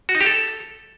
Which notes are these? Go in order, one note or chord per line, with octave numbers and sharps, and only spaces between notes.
F#4
D#4
G4
A4